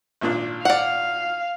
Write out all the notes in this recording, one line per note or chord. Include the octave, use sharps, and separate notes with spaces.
G#1 A#2 D4
D5 F5 F#5